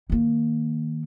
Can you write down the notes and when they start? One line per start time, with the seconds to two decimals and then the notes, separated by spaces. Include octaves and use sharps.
0.10 D#3 A#3